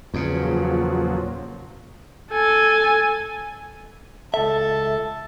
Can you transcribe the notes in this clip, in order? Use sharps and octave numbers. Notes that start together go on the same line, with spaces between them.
E2 A#2 C#3 F3 F#3
A4 G#5
C#2 A4 E5 A5